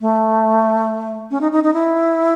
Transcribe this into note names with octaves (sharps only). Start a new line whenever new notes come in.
A3
C#4
D#4
D#4
D#4
E4